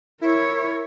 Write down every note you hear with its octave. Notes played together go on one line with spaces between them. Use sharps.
E4 A#4 C#5